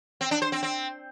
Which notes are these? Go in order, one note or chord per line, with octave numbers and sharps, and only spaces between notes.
C4
D4
C5
C4
C4